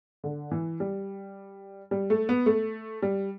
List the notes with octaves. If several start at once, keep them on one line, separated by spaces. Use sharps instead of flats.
D3
E3
G3
G3
A3
B3
A3
G3